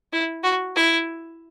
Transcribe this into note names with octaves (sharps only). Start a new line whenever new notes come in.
E4
F#4
E4